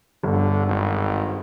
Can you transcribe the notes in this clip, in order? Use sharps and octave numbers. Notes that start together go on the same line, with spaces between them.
G1 D3
G#1